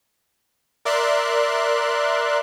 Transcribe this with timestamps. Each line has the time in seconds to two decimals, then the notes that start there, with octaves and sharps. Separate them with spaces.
0.85 A#4 D5 E5 C6 F#6